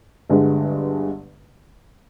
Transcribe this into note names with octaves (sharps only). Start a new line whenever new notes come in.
G1 G2 D3 G#3